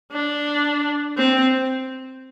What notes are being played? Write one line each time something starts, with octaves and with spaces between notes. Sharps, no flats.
D4
C4